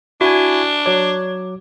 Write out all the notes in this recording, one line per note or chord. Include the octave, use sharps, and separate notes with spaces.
D4 E4 F#4 G#5
F#3 C#5 D6